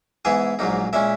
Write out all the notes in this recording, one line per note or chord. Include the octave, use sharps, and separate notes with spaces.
G#2 E3 B3 E4 G#4 G#5
A#1 G#2 F#3 A#3 D#4
A#2 G#3 C#4 E4 E5